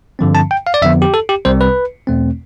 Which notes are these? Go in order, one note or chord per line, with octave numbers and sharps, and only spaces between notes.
G2 D3 F3 C4
A5
G5
F5
D5
F2 D3 F3 B3 E5
G4
A4
G4
C2 C3 G3 C4 C5
B4
E2 B2 A3 C4